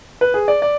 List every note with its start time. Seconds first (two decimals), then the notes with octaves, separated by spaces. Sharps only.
0.21 B4
0.34 G#4
0.48 D5
0.62 D5